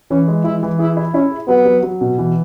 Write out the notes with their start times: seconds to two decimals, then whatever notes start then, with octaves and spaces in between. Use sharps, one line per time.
0.11 E3 C#4
0.28 G#3
0.44 E3 E4
0.63 E3
0.79 E4 G#4
0.97 E4
1.14 C#4 E4
1.31 G#4
1.48 F#3 B3
1.65 F#3
1.83 F#3
2.01 B2
2.18 E3